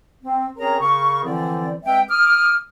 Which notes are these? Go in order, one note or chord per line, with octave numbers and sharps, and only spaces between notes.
C4
C4 C#4 G#4 A#4 C#5 A#5
C#3 G#4 A#4 C#6
D3 E3 F3 C4 E4 D5
G#3 C4 B4 E5 G5
D6 D#6 F6